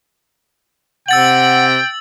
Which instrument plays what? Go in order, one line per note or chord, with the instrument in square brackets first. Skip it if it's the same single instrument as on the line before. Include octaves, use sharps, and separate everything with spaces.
[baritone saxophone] C3 [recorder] F#5 [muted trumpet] G5 [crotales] E6 A6 F#7